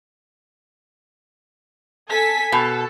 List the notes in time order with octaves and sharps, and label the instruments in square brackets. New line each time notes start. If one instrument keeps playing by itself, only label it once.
[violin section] A4 G#5 B6
[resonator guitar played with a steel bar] B2 [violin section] A4